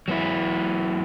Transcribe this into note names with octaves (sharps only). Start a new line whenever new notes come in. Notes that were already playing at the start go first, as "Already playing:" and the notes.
F#3 B3 E4